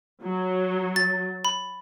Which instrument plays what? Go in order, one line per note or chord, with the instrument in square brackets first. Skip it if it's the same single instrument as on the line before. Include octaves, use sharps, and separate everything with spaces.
[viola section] F#3
[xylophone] A6
B5